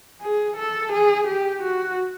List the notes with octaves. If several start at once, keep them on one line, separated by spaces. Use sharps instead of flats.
G#4
A4
G#4
G4
F#4